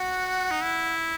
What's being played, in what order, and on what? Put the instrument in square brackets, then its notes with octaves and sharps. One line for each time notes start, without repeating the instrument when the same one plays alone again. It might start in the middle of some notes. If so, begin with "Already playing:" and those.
Already playing: [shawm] F#4 [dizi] F#5
[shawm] D#4
E4